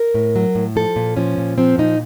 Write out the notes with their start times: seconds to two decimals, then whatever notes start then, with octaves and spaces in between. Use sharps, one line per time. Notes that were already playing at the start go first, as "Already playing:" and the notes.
Already playing: A#4
0.14 A2
0.36 F#3
0.55 A2
0.76 F3 A4
0.96 A#2
1.16 F3 C#4
1.38 A#2
1.58 F3 C4
1.78 A#2 D#4